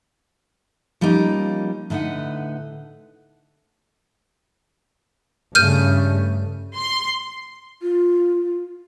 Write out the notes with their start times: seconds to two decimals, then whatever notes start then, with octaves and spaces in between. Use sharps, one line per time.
1.01 F3 G3 A#3 C#4 D#4
1.90 A2 D3 D#4 B4 F#5
5.55 G2 C#3 A3 F6 G6 D#7
6.75 C6
7.82 F4